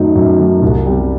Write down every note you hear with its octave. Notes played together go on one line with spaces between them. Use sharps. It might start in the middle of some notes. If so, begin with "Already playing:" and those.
Already playing: F#2 D#3 F#3 A3 D#4
F#2
D#3 F#3 A3 D#4
C2
C3 G3